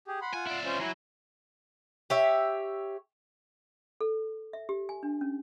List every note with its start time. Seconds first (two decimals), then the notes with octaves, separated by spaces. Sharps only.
0.07 G4 G#4
0.22 F#5 B5 C6
0.34 F4 F#5 G#5
0.47 E4 D5
0.65 C#4 F4 C5
0.80 F#3 E4 G#5 A#5
2.10 G4 C#5 E5
4.01 A4
4.53 E5
4.69 G4
4.89 G#5
5.03 D4
5.21 C#4